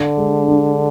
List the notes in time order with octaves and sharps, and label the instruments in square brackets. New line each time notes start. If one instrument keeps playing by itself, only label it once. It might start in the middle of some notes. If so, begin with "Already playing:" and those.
Already playing: [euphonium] D3 [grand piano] D4
[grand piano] G#3
D4